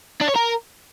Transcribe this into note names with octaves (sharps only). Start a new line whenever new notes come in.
D4
C#5
A#4